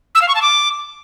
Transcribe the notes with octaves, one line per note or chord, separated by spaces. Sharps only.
E6
F5
C#6
A5
D6